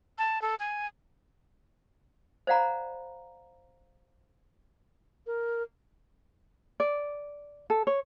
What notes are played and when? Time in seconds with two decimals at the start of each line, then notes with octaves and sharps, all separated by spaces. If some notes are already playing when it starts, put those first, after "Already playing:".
0.18 A5
0.42 A4
0.60 G#5
2.47 C5 D5 F5 F#5 A#5 B5
5.27 A#4
6.80 D5
7.70 A4
7.87 C#5